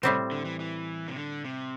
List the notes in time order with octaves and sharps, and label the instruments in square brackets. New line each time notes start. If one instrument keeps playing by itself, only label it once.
[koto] A2 G3 C4 [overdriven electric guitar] C3
[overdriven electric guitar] D3
E3
E3
C3
D3
C3